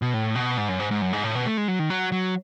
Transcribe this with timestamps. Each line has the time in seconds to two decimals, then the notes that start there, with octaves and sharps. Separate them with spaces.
0.02 B2
0.13 A2
0.35 B2
0.58 G#2
0.68 F#2
0.80 G#2
0.91 G#2
1.02 F#2
1.13 G#2
1.24 A2
1.35 B2
1.46 A3
1.57 G#3
1.68 F#3
1.79 D#3
1.90 F#3
2.12 F#3